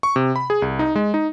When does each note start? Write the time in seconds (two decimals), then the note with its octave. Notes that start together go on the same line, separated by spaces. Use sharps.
0.03 C#6
0.16 C3
0.36 B5
0.50 G#4
0.62 C2
0.79 D#4
0.96 G#3
1.14 D#4